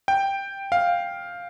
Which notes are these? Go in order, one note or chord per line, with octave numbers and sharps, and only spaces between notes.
G5
F5